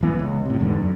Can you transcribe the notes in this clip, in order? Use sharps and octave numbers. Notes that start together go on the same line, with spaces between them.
D1 E3 B3
C#2
A2 C3
E2 G#2 D3
F#2